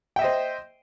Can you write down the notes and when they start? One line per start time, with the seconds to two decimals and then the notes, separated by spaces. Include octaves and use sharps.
0.16 G5
0.19 E5
0.21 D#5
0.24 C5